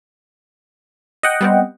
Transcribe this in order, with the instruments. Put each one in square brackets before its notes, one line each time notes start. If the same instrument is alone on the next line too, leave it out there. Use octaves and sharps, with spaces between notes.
[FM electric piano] D#5 F#5 G5
[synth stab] G3 B3 C4